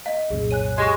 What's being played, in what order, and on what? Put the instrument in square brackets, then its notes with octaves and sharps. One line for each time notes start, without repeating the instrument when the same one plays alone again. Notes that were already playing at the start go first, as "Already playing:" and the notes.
[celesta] D#5 [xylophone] F5
[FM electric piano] C2 F#2 A#2 [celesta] G#4
[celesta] C#5 G#5 F#6 [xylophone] D#7
[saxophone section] G#3 [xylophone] G4 C#6